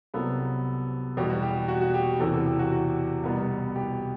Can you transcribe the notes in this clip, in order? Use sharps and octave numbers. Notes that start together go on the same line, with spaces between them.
C2 C3 F#3 B3 A4
E2 B2 G3 G4
F#4
G4
F#4
F#4
G4
E2 C3 E3 A4
A4
G4
F#4
F#4
C2 B2 G3 B3
G4